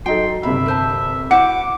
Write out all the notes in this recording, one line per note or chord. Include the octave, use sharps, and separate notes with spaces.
F#3 D#4 A4 G5 C6
G1 C3 E5 B5
A#4 C5 A5
E4 F#4 C5 F#5 D6 C#7